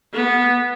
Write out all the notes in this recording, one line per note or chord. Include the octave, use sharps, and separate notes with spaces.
B3